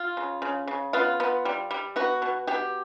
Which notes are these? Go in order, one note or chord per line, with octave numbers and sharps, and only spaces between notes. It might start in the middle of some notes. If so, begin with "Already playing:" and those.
Already playing: F4
C#3
C#3
C#3
B3 F4
B3
G3
G3
B3 F#4
B2
B2 G4